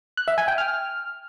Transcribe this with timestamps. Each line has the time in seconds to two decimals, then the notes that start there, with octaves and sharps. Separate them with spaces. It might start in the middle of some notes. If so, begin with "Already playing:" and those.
0.17 F#6
0.28 E5
0.38 G#5
0.48 G5
0.58 F6